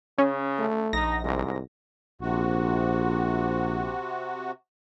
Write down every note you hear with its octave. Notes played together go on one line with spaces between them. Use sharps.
C#3 C#4
A3
A#1 D#4 A#6
C2 G#2
A#1 C3 F#4